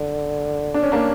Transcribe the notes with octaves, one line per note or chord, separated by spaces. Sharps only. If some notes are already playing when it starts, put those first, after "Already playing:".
Already playing: D3
D4
C#4
A#3 D4